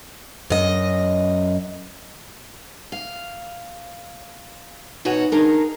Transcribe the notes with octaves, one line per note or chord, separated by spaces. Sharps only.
F#2 D#5
F5
B2 D#4 F#4 C#5 G#5
D4 D#4 G#4 A#4